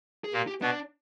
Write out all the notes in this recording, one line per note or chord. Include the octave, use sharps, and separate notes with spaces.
G#4
A#2 A#3 G4
G4
B2 B3 D4